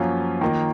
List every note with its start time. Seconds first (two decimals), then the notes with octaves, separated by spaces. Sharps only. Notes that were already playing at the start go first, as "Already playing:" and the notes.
Already playing: F#2 F3 A#3 C#4 F4
0.41 D#3 A#3 F4 A#4 D#5